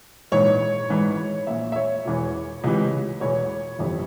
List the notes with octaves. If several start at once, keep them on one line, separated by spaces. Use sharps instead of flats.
A#1 G#2 E3 C#5
G#1 G#2 E3
A#1 A#2 E5
E5
C#5
E1 E2 E3
C#2 C3 E3
E1 E2 E3 C#5
G1 F2 C3 E3